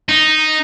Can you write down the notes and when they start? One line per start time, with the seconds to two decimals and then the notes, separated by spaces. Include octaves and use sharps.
0.09 D#4